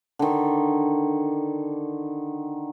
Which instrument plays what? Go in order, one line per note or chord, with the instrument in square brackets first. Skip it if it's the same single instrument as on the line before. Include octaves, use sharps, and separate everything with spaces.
[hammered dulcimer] D3 D#3